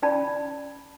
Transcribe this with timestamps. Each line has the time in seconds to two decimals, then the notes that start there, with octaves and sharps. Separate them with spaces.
0.02 C#4 D5 A5 B5